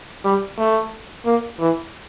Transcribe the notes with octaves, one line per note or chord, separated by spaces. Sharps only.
G3
A3
A#3
E3